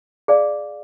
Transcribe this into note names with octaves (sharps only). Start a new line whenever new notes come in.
G#4 D5 F5